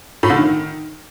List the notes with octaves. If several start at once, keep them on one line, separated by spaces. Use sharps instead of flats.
A2
D3
D#3